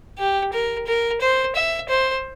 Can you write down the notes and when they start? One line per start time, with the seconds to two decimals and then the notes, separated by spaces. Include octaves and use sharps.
0.19 G4
0.53 A#4
0.87 A#4
1.21 C5
1.56 E5
1.89 C5